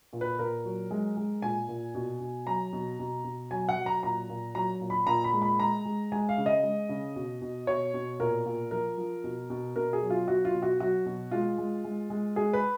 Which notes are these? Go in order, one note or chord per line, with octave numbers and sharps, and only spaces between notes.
A#2
B4
A#2 A#4
F#3
G#3
G#3
A#2 G#5
A#2
B2
B2
F#3 A#5
B2
B2
B2
F#3 G#5
F#5
F#3
A#5
A#2 A#5
A#2
F#3 A#5
A#2
B5
A#2 A#5
B5
G#3
B5
G#3 A#5
G#3
G#3 G#5
F5
C#3
D#5
G#3
C#3
B2
B2
B2 C#5
B2
A#2 A#4
A#2
F3 A#4
F3
B2
B2
B2 A#4
G#4
F#3
F4
F#3 F#4
F4
B2
F#4
F#3 F#4
B2
G#3 F4
G#3
G#3
G#3
G#3 G#4
B4